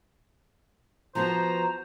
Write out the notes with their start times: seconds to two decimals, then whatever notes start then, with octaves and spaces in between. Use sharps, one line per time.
1.15 F3 B3 F#4 C5 A#5